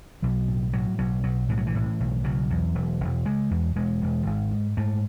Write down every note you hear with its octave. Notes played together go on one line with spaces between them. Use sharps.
B1 F#3
A2
A2 F#3
B1 F#3
B1 F#3
A2 E3
F#3
E3
A2
B1
C#3 F#3
E2
E1
E1
C#3 G#3
E2
E1 G#3
E1
G#1
G#2
G#2 A3